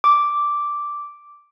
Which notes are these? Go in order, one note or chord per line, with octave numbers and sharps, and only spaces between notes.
D6